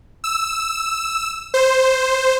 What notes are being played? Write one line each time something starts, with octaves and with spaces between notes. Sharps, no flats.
E6
C5